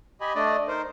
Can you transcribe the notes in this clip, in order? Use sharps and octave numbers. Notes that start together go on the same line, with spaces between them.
G4 D#5 G#5 B5
A3 D4 D5 D#5
D#4 A#4 C5